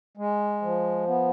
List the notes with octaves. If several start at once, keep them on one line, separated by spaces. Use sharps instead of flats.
G#3
F3
B3